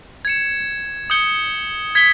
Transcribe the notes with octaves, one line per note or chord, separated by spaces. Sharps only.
G#6 C#7 E7
D#6 G6 C#7 G7
G#6 B6 G7